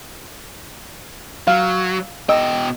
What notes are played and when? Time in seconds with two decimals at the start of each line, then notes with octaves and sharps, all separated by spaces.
1.47 F#3 F5
2.29 B2 D#5 G5 E6